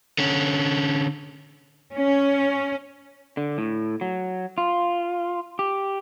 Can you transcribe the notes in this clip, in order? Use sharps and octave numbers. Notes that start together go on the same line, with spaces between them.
D3 C#4
C#4
D3
A2
F#3
F4
G4